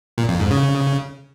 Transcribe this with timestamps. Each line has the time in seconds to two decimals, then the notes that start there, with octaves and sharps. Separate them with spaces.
0.18 A#2
0.29 F2
0.40 G#2
0.51 C#3